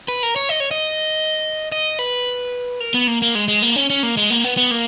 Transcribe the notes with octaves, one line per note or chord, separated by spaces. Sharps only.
B4
A#4
C#5
D#5
C#5
D#5
D#5
B4
A#4
B3
A#3
A#3
G#3
G#3
A#3
C#4
C#4
A#3
G#3
A#3
B3
B3
A#3